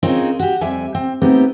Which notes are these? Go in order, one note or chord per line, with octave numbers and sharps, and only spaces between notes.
C4 C#4 D#4 F4 G#4 A#4
F#4 G4
F2 G3 E5 G#5
C4
A3 B3 C4 D#4 G4